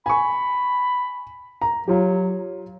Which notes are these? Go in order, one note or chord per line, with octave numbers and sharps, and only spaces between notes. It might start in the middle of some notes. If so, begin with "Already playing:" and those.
G#5 B5 C#6
A#5
F#3 F4 G4